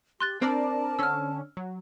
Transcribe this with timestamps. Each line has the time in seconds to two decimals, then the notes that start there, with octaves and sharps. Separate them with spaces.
0.20 G4 C6 F#6 A6
0.42 C4 D4 A#4 D5 A5
0.99 D3 C#4 E6 F6
1.57 F#3